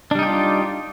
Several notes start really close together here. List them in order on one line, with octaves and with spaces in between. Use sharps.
D4 G3 D#4 G4 F4